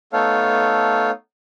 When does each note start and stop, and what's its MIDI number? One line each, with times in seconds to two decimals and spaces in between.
0.13 1.11 57
0.13 1.11 59
0.13 1.11 63
0.13 1.11 69
0.13 1.11 73
0.13 1.11 77